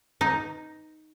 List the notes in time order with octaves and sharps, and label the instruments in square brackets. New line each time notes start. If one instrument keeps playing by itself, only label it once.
[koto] D#4